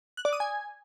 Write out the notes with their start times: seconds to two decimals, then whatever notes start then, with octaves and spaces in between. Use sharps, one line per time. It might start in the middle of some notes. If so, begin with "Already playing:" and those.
0.17 F#6
0.25 D5
0.33 D#6
0.40 G#5